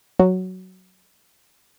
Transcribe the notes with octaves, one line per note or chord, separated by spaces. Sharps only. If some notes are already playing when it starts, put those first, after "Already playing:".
F#3